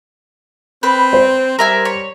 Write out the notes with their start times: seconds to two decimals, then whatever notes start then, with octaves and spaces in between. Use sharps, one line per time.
0.83 C4 B4
1.13 C5
1.59 G3 A#4 E5 G#5
1.85 C#5